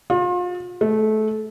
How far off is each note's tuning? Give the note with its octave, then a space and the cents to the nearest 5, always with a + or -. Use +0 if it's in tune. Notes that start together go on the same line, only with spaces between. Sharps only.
F4 +35
A3 -25